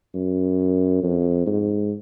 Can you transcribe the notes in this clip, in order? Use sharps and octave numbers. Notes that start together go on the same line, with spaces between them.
F#2
F2
G#2